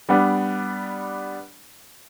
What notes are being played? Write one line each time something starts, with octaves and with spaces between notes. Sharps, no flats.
G3 B3 D4